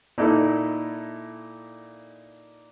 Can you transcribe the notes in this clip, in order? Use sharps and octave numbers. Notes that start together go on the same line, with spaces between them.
A#2 D#4 E4 A4